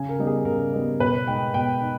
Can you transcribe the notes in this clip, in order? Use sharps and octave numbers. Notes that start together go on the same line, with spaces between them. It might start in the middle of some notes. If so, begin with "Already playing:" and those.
Already playing: C#3 G#5
A#4
G3 B3 D#4
G#4
C#3 A#4
G3 B3 D#4
B2 B4
G#3 D#4 G5
B2 G5
D#4